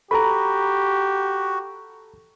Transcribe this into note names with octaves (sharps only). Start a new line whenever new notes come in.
F#4 G4 A4 A#5 B5